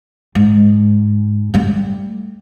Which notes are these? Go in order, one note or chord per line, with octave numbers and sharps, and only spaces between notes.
G#2
G3 A3